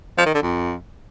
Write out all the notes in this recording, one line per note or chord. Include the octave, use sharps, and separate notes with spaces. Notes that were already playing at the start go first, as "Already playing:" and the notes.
F3
D#3
D3
F2